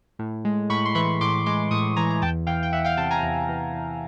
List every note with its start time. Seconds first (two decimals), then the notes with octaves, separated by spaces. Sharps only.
0.19 A2
0.45 G#3
0.70 A2 B5 C#6
0.85 C6
0.95 E3 B5 C#6
1.21 A2 C6 D6
1.46 G#3 C6 D6
1.71 A2 C#6 D#6
1.96 E3 G#5 A#5
2.11 A#5
2.22 E2 G5 A5
2.47 E3 F5 G5
2.63 G5
2.73 E2 E5 F#5
2.85 F5 G5
2.97 C3 G5 A5
3.11 G#5 A#5
3.23 E2
3.49 E3
3.74 E2